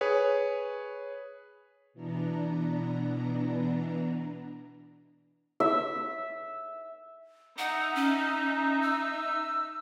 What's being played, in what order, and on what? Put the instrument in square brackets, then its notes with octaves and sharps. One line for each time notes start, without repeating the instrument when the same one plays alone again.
[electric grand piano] G#4 B4 C#5
[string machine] B2 E3 B3 D4 A#5
[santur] E5
[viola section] D#4 E5 [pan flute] F#5
[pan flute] C#4
E6